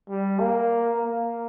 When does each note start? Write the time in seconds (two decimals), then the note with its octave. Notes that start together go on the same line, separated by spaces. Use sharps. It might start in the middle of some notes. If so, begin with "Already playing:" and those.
0.10 G3
0.39 A#3
0.98 A#3